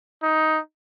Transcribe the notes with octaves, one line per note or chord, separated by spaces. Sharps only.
D#4